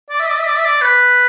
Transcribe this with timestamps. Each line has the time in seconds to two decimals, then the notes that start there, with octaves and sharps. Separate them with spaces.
0.10 D5
0.19 E5
0.28 D5
0.37 E5
0.46 D5
0.56 E5
0.64 D5
0.81 B4